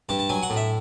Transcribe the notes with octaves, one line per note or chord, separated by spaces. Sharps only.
G2 A5
A5
F#3 G#5
F#5
A2
E5